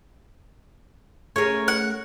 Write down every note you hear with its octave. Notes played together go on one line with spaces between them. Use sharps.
A3 C#4 G#4 A#4 C#5
F#5